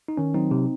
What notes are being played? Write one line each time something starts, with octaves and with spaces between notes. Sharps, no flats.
D#4
D#3 C#4
F#3 C4 D#4
C3